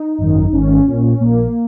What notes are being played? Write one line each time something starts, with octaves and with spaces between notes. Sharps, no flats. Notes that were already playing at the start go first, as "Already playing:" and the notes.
Already playing: D#4
G#1 F#2 D#3
G#1 G#2 D#3 C#4
A#1 A#2
A#1 A#2 A#3